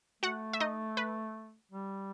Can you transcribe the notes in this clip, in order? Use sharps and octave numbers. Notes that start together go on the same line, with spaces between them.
A3 F#4 F#5
E5
D#4 D#5
B4
G3